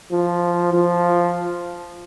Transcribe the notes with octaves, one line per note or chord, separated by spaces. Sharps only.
F3
F3